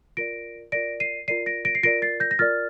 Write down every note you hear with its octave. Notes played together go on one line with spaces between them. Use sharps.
F4 A#4 D5 A#6 D7
F4 A#4 D5 A#6 D7
C7 D#7
F4 A#4 D5 C7 D#7
A#6 D7
A#6 D7
C7
F4 A#4 D5 A#6 D7
A6 C7
G6 A#6
A#6
F4 A#4 D5 F6 A6